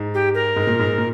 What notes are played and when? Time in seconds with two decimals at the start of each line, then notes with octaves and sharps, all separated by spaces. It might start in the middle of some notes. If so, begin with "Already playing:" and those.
Already playing: G#2
0.14 G4
0.34 A#4
0.56 G#2
0.67 A#2
0.79 G#2
0.98 A#2